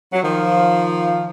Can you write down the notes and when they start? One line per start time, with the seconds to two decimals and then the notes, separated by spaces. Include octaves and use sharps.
0.13 F#3
0.23 D#3 F3